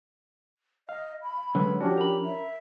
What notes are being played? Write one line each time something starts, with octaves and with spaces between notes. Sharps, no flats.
D#5 F5
B5
D3 F#3 G#3 C#4 B4
F3 C#4 D4 F#4 G4
A#4 B5
E5